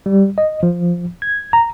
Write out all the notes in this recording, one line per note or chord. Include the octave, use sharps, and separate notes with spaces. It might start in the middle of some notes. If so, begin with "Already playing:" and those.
G3
D#5
F3
G#6
A#5